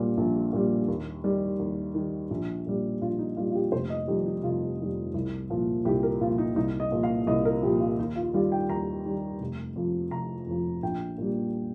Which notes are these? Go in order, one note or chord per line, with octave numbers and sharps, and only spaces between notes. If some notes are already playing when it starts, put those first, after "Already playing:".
Already playing: A#1 A#2 G3
A#1
A#2 G3
D#2
D#3 G3
D#2
D#3 G3
A#1
A#2 G3
A#1 F4
D#4
A#2 G3 F4
F4
G4
F1 C5
D#5
F2 D#3 G3 G4
D#4
F1 F4
F2 D#3 G3
C2
A#2 F3
C2 G4
A#4
A#2 F3 F4
D#4
C2 D#4
D#5
A#2 F3
F5
C2 D#5
A#4
A#2 F3 G4
F4
D#2 D#4
F4
D#3 G3 F4
G5
D#2 A#5
D#3 G3
F1
F2 F3
F1 A#5
F2 F3
A#1 G5
A#2 G3